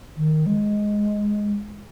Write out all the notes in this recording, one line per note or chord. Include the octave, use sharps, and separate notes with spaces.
D#3
G#3